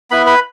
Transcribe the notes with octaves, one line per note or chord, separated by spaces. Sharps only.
B3 E4 B4 B5
B4 B5